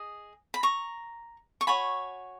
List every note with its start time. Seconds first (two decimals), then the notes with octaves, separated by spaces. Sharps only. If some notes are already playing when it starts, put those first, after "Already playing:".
Already playing: G#4 D#5
0.54 B5
0.63 A#5 C#6
1.61 C#6
1.67 F#4 C#5 G#5 B5